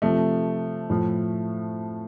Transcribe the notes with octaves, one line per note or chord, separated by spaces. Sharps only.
C3 F3 A3
A2 F3